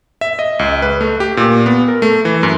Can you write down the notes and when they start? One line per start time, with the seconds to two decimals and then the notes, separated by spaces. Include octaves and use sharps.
0.21 E5
0.39 D#5
0.59 C#2
0.82 B4
1.01 A3
1.20 G4
1.37 A#2
1.66 B3
1.88 A#4
2.02 A3
2.25 E3
2.43 F#2